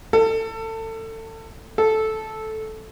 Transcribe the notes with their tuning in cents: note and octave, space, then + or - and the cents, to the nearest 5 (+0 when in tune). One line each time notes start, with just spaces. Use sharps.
A4 +25
A4 -10